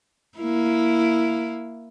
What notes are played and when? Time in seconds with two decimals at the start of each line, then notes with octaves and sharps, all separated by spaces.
0.38 A#3 E4